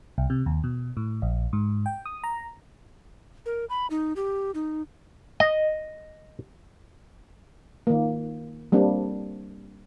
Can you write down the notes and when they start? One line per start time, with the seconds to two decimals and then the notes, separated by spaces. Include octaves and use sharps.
0.18 C2
0.30 C3
0.46 D#2
0.64 B2
0.97 A2
1.22 A#1
1.53 G#2
1.86 G5
2.06 D#6
2.24 A#5
3.46 A#4
3.70 B5
3.90 D#4
4.16 G4
4.55 D#4
5.40 D#5
7.87 D#3 A#3
8.72 G3 A#3 C4 D4